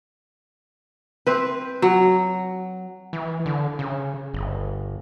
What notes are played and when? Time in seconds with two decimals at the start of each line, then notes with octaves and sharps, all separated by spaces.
1.27 C4 B4
1.82 F#3
3.13 E3
3.46 D3
3.79 C#3
4.34 G1